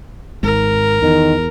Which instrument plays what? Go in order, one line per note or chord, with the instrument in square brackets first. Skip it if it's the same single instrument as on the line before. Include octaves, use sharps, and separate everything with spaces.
[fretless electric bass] G#1 G#2 [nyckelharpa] A#4
[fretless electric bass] E2 [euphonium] D#3